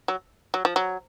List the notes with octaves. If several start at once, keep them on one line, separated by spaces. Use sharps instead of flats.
F#3
F#3
F3
F#3